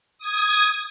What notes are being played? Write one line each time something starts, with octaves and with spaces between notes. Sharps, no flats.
D#6 G#6